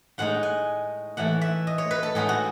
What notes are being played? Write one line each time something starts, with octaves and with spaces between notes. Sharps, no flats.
A2 G#3 D#4 F#5
G#5
A2 E3 A3 F#5
E5
D#5
C#5
B4
A4
A2 G#3 B3 D#4 G#4
F#4